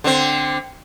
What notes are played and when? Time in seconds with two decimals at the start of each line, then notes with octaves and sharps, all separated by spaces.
0.04 D3 C4